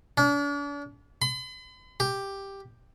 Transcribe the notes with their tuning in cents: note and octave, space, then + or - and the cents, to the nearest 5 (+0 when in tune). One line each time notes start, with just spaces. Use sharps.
D4 -40
B5 +45
G4 +5